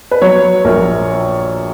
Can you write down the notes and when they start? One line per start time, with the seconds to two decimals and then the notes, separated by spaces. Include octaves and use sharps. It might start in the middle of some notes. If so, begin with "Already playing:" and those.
0.11 B4
0.22 F#3 C#5
0.65 A#1 A#4